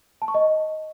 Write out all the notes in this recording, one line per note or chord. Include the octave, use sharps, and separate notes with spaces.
A5
C#6
D#5